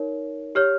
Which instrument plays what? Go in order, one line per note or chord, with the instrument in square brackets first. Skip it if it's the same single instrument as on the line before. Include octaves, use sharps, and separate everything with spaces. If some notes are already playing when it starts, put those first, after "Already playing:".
Already playing: [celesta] D#4 A#4 C#5
G4 C#5 F6